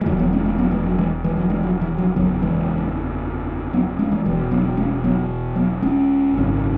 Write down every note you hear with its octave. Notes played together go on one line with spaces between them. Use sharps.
G#3
E1 E2 C#3 F#3
F#3 B3
G#3 C#4
G#3 C#4
F#3 B3
E3 G#3
F#3
E3 G#3
E3 G#3
F#3
E3 G#3
F#3
E3
F#3
F#1 E2 C#3 F#3 B3
E3 G#3
F#3 B3
G#3 C#4
E3 G#3
E1 E2 B2 E3 G#3
F#3 B3
G#3 C#4
F#3 B3
F#3 B3
G#3 C#4
G#1 F#2 C#3